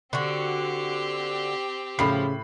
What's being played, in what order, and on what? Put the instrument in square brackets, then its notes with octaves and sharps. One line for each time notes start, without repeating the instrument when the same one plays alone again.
[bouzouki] D3 F#4 [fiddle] C4 G4
[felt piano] A2 B5 C7 [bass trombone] C#3 [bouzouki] F3